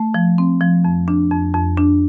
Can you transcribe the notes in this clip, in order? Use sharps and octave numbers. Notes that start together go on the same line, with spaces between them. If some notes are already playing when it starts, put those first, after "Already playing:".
Already playing: A3
F3
C4
F3
F2
D4
F2
F2
D4